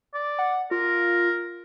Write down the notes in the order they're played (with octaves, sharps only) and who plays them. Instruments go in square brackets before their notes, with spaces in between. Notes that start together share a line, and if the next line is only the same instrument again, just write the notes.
[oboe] D5
[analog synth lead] F#5
[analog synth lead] F4 [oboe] A#4